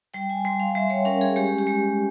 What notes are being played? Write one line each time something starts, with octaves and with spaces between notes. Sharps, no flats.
G3 G5
G#5
G3 C6
F5
G3 E5
C#5
C#4 A#4
G#4
G#3 G4
G4
G#3